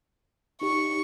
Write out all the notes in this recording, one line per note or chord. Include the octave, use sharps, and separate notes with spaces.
D#4 G4 C#6